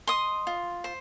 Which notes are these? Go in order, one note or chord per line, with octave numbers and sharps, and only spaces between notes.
D#5 C6 D#6
F4
C5